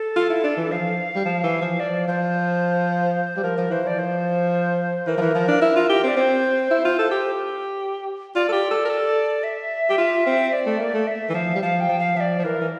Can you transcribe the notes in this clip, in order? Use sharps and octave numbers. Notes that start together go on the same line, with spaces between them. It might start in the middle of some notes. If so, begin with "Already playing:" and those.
Already playing: A4
F4
E4
D4
E3
F3 F5
G3
F3
E3
F3
F3 D5
F3 C5
G3
F3 A#4
F3
E3 C5
F3 D5
C5
E3 A#4
F3
E3
F3
D4
E4
F4
G4
C4 D5
C4 C5 D5
E4
F4
A4
G4
F4 D5
A4
G4
A4
A#4
A4
E5
G4
F4
C4
D5
A3
A#3
A3
E5
E3
F3 F5
G3
F3 F5
G5
F3
F5
F3 D5 E5
F3
E3 A#4
E3